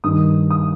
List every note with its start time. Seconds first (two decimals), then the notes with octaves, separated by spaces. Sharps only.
0.04 G2 D#3 G3 D#6
0.51 D#6